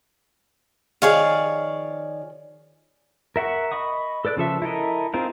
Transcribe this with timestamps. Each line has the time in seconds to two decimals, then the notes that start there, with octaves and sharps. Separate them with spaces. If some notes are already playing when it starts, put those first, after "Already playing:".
1.02 D#3 F3 G#4 C#5 D5 F5
3.36 A#4 E5 F#5 C#6
3.72 D#5 B5 C#6 D#6
4.25 A4 B4 D5 E6 F#6
4.37 C#3 F3 A4 E5
4.62 E4 A4 A#4 D#5
5.14 C4 D#4 F4 G#4 A#4